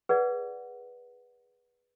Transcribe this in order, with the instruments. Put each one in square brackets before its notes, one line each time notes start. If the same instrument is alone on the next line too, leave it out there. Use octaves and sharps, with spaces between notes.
[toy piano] G#4 B4 D5 F#5